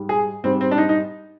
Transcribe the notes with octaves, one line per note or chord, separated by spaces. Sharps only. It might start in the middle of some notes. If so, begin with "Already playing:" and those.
Already playing: G#2 G3
G#4
G#2 G3 C4
C4
D4
D#4
D#4